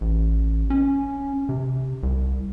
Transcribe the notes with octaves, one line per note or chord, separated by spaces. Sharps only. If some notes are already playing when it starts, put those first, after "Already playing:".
A1
C#4
C3
C2